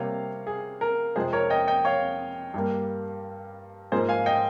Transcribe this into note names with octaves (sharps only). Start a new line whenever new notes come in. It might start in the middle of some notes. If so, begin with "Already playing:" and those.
Already playing: C3 G3 A#3 C#5 F5
G#4
A#4
F2 C3 F3 G#3 G#4 C5
A#4 C#5
D#5 G5
D#5 G5
C#5 F5
G2 G3 A#3
G#2 F3 A#3 G#4 C5
F5 G#5
D#5 G5